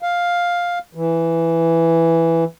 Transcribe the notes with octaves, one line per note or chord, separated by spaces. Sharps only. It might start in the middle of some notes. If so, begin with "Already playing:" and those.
F5
E3